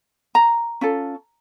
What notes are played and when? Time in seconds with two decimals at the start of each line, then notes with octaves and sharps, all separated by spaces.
0.35 A#5
0.81 C#4 F4 A4